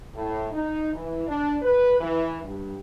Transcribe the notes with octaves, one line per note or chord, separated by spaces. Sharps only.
A2
D#4
E3
D4
B4
E3
G2